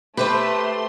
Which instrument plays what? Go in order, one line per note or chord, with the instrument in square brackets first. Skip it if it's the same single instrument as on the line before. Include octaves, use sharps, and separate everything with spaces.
[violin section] A3 C6 [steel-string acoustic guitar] G4 C5 E5 [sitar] B4